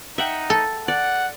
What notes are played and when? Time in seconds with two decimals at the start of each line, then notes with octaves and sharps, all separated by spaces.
0.18 D#4 E5 F#5 G5
0.50 A4
0.88 D5 F#5